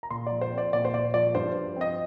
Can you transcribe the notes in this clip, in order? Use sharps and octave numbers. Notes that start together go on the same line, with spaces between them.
A#5
A#2 C6
F3 D5
C5
C4
D5
A#2 D5
C5
A#2 D5
F3 D5
G2 C5
F3
C4 D#5